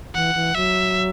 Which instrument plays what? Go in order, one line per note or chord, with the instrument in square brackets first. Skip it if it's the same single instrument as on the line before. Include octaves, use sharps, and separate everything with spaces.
[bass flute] E3 [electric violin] F#5
[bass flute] E3
[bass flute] F#3 [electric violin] E5